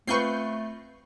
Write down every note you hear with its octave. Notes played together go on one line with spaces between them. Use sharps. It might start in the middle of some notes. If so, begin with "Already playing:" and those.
A3 C4 F4 B4 C#6 G6 C7